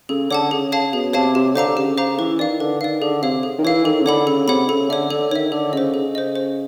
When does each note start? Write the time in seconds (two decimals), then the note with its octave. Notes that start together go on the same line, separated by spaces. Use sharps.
0.09 C#3 A4
0.31 D3 C#5 F#5 A5
0.51 C#3 G#4
0.72 C#5 F5 A5
0.93 B2 G#4
1.13 C3 C#5 F5 A5
1.35 C3 G4
1.55 D3 C5 F5 A#5 D6
1.68 D3
1.77 C#3 G4
1.97 C5 F5 A#5 D6
2.19 E3 B4
2.39 D#3 D5 F5
2.60 D3 B4
2.81 D#3 D5 F5
3.02 D3 G#4
3.23 C3 C#5 F5
3.43 G#4
3.58 D#3
3.64 E3 C#5 F5
3.85 D#3 A4
4.00 C#3
4.05 D3 C#5 F#5 B5
4.26 C#3 A4
4.48 C3 C#5 F#5 B5
4.69 C#3 A4
4.89 D3 C#5 E5
5.10 D3 A4
5.31 D#3 C#5 E5
5.52 D3 A4
5.73 C#3 C5 D#5
5.94 C#3 A4
6.15 C5 D#5
6.36 C5